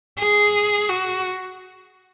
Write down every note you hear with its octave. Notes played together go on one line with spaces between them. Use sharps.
G#4
F#4